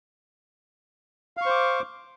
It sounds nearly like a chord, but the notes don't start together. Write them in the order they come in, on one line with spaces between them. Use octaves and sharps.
F5 C#6 C5 D6